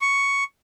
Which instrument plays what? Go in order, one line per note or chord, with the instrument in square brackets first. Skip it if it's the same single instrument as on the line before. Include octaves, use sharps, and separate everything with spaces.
[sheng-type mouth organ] C#6